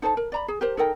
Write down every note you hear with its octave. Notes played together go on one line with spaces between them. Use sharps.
D#4 A4 C5 A5
A#4
D5 A#5 B5
G#4
G4 A#4 C5
D#4 A4 A#4 G5